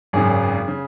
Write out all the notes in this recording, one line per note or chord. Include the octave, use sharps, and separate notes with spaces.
G#1 F#2 C#3 G#4
C#3